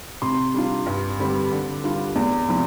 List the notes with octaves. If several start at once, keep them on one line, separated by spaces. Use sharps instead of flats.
C3 C6
G3 D4 F4
G2
D3 G3 C4
D3
G3 D4 F4
E2
C3 F3